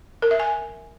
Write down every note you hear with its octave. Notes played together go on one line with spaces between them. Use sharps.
A#4
E5
G#5